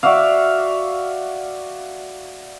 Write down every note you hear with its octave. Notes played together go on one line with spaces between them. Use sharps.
F#4 D5 E5 F5